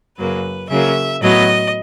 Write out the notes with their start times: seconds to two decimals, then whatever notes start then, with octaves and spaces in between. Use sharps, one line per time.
0.18 F#2 C#3 F#3 A#3 B4
0.70 C#3 F#3 A#3 E5
1.22 A2 F#3 B3 D#5